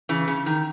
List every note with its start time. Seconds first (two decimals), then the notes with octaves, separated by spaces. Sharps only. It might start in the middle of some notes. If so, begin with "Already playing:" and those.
0.09 C#3 E3
0.28 C#3
0.46 D#3